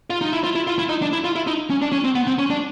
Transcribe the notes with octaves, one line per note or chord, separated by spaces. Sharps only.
F4
D#4
E4
F4
E4
F4
E4
D#4
D4
E4
F4
E4
D#4
C#4
D4
C#4
C4
B3
C4
C#4
D4